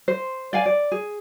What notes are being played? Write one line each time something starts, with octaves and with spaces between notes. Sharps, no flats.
C5
D5 F5 G#5
D5
G#4